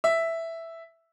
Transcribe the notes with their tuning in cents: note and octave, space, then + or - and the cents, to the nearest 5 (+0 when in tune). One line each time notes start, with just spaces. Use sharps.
E5 +0